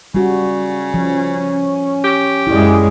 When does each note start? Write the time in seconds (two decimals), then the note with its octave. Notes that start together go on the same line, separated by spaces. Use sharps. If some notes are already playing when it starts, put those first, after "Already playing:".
0.15 C#3 G3 F#4
0.94 F3 C#4
2.04 G4
2.47 F#2 G#3 E4 D5